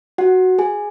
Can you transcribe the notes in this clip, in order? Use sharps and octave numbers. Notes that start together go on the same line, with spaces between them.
F#4 F#5
G#4 G#5